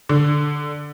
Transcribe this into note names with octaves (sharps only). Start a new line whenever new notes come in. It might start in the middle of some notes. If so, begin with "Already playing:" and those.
D3